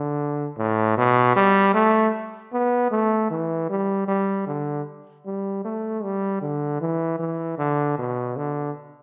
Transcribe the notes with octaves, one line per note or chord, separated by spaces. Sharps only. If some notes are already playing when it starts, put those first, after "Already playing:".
Already playing: D3
A2
B2
G3
A3
B3
A3
E3
G3
G3
D3
G3
A3
G3
D3
E3
E3
D3
B2
D3